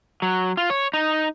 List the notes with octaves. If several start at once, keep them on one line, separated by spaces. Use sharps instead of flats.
F#3
F4
C#5
D#4